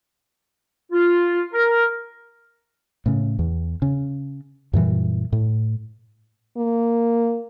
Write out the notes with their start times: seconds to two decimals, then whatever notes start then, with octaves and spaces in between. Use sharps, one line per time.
0.92 F4
1.53 A#4
3.06 A2 C#3
3.39 E2
3.82 C#3
4.73 F#2 A#2 E3 G3
5.32 A2
6.57 A#3